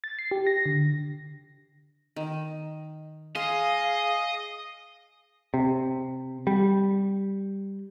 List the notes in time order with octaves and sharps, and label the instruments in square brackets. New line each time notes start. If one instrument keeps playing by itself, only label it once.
[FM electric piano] A6
C7
G4
A#6
D3
[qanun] D#3
[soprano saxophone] G#4 [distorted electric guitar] D#5 [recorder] F5 [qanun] C6
[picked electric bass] C3
G3